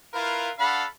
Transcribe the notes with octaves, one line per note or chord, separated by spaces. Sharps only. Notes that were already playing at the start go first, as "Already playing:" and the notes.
E4 F4 A#4 B4 F5
D4 A4 F5 F#5 B5